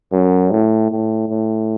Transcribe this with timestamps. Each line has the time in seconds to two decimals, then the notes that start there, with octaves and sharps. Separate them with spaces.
0.13 F#2
0.51 A2
0.91 A2
1.29 A2